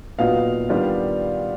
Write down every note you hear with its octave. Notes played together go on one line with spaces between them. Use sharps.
A#2 F#3 B3 D#4 F5
D#3 G3 B3 D4 F4